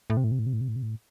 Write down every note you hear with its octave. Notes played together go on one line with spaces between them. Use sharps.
A2
C3
A2
C3
A2
C3
A2
C3
A2
C3
A2